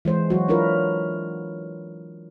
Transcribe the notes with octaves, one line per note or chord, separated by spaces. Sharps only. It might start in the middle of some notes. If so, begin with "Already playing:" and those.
E3 G#3 C5
F#3 F#4
D4 E4 F4 A#4 B4